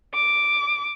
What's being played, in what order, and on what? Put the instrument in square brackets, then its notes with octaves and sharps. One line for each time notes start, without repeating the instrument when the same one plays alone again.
[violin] D6